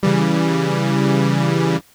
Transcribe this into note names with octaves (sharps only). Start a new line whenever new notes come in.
C#3 E3 G3